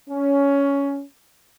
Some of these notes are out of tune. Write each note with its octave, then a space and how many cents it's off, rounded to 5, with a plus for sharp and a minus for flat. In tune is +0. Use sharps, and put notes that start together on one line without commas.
C#4 +15